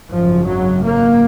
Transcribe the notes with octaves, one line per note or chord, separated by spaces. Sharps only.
G#1 F#2 C#3 F3
F#3
A#3